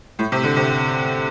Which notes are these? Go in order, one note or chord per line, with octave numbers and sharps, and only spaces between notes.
A2
C3
D3
C3